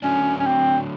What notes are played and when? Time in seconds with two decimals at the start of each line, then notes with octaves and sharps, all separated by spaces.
0.02 D3 F#3 A3 C#4 D4
0.40 C#4
0.47 C4